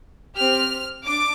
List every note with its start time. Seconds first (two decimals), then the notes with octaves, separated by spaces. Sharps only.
0.36 C4 G4 F6
1.04 D4 D6